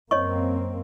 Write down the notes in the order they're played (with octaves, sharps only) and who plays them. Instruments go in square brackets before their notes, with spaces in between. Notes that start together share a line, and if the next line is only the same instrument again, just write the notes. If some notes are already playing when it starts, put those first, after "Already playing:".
[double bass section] F#2 A#3 C4 [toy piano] C#5 D#5 C#6